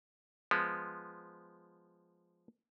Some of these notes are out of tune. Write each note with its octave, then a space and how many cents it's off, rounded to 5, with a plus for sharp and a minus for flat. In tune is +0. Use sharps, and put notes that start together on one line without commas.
F3 +0 G#3 +0 B3 +0